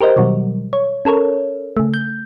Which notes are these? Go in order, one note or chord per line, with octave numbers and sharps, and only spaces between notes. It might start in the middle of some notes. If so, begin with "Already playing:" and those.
G4 A#4 C5 D#5
B2 D#3 F#3 G3
C#5
C#4 A4 A#4 C#5
C#3 A3
G6